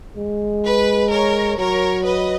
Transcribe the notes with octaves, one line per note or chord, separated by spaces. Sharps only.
G#3
B4
A#4 C#5
F#3 A#4 C#5
B4 D#5